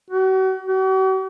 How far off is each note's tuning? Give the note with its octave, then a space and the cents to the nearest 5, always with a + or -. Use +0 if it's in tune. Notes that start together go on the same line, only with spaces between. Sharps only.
F#4 +40
F#4 +45